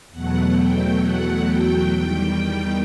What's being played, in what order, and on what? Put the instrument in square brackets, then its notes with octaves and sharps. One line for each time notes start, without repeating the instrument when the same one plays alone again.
[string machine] E2 B2 F#3 A3 F#5
G5
F#5
G5
E2 D#3 G3 G5